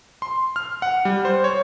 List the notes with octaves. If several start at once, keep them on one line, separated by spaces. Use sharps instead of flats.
C6
F6
F#5
G3
C5
C#5